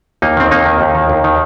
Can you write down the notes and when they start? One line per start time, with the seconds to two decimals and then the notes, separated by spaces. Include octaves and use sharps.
0.22 D#2 A#3 D#4
0.37 D#3 C4
0.51 D#2 A#3 D#4
0.66 D#3
0.81 D#2
0.95 D#3
1.10 D#2
1.24 D#3